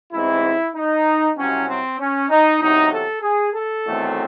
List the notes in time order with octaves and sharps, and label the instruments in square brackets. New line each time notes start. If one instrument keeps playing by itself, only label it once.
[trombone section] A1 G#2 E3 G#3 C4 E4
D#4
C2 C3 F#3 C4 C#4
C4
C#4
D#4
E2 C3 F#3 D#4
A4
G#4
A4
E2 D#3 F#3 A3 C4